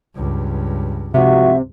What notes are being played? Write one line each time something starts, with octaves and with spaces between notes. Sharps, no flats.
C#2 G2
G#2 C3 F3 F#4 E5